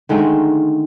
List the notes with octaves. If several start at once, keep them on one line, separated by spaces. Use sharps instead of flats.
D3 D#3 G#3 A3